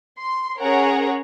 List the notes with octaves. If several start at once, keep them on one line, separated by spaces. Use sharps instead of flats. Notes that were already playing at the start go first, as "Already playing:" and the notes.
C6
C#4 G#4 A#4 C#5 F#5 A#5